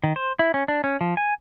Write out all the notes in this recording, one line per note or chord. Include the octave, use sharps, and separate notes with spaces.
D#3
C5
E4
C#4
D4
C#4
F3
G#5